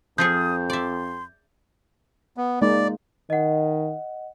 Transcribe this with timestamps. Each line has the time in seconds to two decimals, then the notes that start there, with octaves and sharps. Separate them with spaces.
0.18 F2 F3 F4 G#4 D#6 G6
0.70 D5 E5 C6
2.37 B3
2.62 G#3 A#3 D#4 D5
3.30 D#3 D#5 F#5